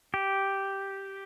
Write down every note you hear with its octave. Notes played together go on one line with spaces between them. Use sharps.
G4